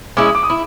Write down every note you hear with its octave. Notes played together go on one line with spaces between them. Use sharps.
G#3 C#4 E4 D6
D#6
D6
D#6
E4